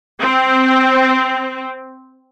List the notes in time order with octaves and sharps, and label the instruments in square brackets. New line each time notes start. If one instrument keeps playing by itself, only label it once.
[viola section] C4